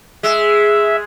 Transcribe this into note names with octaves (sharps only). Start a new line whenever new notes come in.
G#3 E5